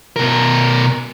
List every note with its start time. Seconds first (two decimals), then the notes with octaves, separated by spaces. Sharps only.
0.16 B2 A#4